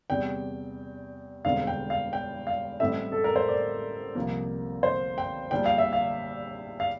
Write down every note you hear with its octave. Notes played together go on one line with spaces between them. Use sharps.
E2 C3 G3 G5
E1 E2 D3 G3 C4 F5
G5
F5
G5
F5
A1 A2 G3 C4 E5
A4
A#4
C5
D5
C2 C3 F3 A#3
C5
G5
A#1 A#2 G3 G5
F5
E5
F5
F5